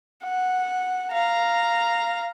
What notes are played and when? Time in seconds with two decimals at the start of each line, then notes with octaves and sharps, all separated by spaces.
0.23 F#5
1.12 F5 A#5